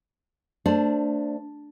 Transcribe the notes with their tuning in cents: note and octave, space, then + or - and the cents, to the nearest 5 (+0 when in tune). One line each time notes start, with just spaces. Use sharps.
A3 +30 D4 +0 C5 +0